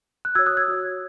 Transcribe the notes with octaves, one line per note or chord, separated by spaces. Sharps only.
F#6
F#4 C#5 E6 G#6
D#6 F#6
E6 G#6
F#4 C#5